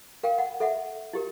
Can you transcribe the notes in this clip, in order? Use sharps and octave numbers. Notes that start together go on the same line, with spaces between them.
A#4 F5 G5
F#5
A4 E5 F#5
E4 G4 A#4